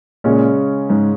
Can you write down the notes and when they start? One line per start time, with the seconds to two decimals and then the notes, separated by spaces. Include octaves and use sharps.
0.24 A#2 C#3 G#3 C#4
0.90 G#2